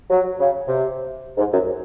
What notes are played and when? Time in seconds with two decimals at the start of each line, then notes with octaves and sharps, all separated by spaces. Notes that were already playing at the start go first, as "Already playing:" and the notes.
0.09 F#3
0.39 C#3
0.66 C3
1.37 G#2
1.52 F#2